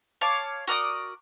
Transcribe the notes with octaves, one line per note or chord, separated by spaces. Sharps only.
C#5 F5 A5 D6
F#4 A#4 D5 D#6